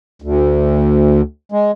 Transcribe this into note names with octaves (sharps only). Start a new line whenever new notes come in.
D2
G#3